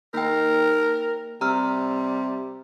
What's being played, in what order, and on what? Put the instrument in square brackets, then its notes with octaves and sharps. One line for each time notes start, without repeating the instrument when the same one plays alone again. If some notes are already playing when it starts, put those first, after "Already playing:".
[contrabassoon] D#3 [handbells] A#3 G5 [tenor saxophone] A#4
[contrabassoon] C3 [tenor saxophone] G3 [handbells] A#5 E6 F6